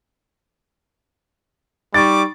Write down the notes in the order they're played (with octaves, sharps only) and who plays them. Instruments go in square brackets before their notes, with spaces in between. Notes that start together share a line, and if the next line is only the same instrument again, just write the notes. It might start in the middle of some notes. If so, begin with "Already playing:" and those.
[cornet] G3 [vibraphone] D#4 C#6 [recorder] D6 [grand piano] A6